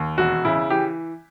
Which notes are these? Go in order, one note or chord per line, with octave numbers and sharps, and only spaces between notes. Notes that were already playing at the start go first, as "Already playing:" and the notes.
Already playing: D#2
E1 F#4
C#3 E4
E3 G4